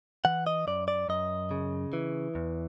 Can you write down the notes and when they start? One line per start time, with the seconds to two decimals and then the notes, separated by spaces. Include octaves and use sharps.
0.25 E3 F#5
0.47 D#5
0.67 F#2 D5
0.88 D5
1.09 F#2 D#5
1.51 C#3
1.93 E3
2.35 E2